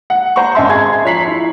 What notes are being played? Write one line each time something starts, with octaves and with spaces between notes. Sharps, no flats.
F#5
C5 F#5 A#5 C#6
G#1 C#4 D#5 E5 A5 C6
G#4 A5 C6 G#6
F3 C#5 A#5 B6 C7 F#7
E4